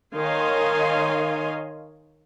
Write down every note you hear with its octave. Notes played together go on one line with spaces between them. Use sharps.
D#3 C#5 D#5 F5 G#5 C6